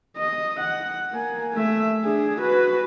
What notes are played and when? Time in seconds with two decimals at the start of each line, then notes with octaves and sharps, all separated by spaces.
0.17 D#5
0.60 F#5
1.11 A#3 G#5
1.54 A3 E5
2.04 D4 G#4
2.41 F#4 B4